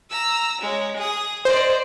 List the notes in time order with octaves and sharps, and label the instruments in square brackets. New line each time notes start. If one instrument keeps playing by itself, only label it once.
[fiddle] A#5 E6
G#3 C#5
G#4 D#6
[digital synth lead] C5 [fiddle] D5 D#5